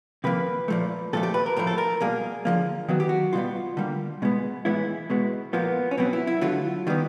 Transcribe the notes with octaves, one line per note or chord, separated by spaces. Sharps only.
C3 F3 A#3 B4
A#2 F3 A3
A#2 F3 A3 A4
G4
B4
A#4
A2 F3 A3 A#4
A4
A#4
B2 G3 A#3 G#4
D3 F3 A#3
D#3 F#3 B3 F#4
G4
F#4
B2 G3 B3 F4
D3 G3 A#3
B2 G#3 B3
A2 E3 G#3 B3 E4
B2 G#3 B3
A#2 F3 A#3 B3
C#4
B2 F#3 B3 C4
E4
E4
D3 F#3 A3 F4
D#3 G3 B3